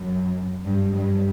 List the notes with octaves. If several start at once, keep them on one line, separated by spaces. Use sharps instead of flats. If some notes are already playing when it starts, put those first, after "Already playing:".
Already playing: F#2
G2
G2